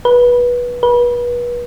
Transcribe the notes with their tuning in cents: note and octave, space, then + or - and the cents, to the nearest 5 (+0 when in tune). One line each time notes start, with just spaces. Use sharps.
B4 -20
B4 -35